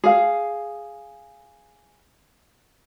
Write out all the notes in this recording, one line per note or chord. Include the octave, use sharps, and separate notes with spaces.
G#4 F5